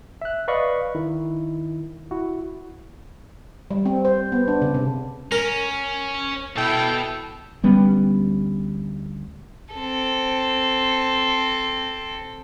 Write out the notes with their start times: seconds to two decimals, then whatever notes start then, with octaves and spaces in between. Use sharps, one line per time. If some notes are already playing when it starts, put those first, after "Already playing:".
0.22 E5 F#6
0.48 B4 D5 D#5 F5 B5 C#6
0.95 D#3 E4
2.11 E4 F#4
3.71 G3
3.85 C4
4.05 C5
4.32 B3
4.48 D4
4.62 C#3
4.74 C3
5.32 C#4 A#4
6.56 B2 E4 A4 G5
7.64 D2 G3 B3 C#4
9.75 C4 A4